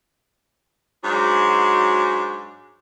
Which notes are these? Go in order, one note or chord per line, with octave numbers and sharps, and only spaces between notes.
G#2 F#3 D4 F#4